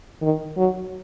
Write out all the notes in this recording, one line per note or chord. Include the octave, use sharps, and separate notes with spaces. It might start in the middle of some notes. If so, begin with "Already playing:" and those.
D#3
F#3